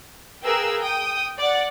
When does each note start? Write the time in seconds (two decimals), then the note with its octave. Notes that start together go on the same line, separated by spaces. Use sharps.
0.43 G#4 A#4 B4 F5 G5 E6
0.80 G5 D#6
1.38 D5 F#5